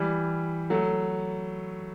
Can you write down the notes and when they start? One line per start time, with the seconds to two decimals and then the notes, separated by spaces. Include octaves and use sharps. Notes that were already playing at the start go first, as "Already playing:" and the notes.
Already playing: E3 G3
0.70 F#3 A3